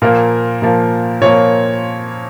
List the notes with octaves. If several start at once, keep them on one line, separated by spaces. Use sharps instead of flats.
A#2 F3 A#3 A#4
A#2 F3 A#3
A#2 F3 A#3 C#5